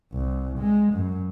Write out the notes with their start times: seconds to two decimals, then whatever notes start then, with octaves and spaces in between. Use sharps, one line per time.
0.13 C2
0.59 G#3
0.94 F#2